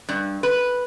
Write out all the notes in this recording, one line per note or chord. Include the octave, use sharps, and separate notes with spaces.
G2
B4